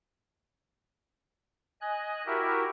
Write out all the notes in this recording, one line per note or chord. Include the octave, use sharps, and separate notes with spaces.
D#5 G#5 F#6
E4 F#4 G4 A#4 E5